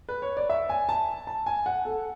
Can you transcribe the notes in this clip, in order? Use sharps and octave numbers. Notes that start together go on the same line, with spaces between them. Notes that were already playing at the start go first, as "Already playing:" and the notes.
B4
C#5
D5
E5
G#5
A5
A5
G#5
F#5
A4